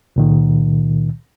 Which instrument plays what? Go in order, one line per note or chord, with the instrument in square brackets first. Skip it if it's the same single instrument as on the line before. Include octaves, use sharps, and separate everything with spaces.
[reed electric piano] C#2 A#2 D#3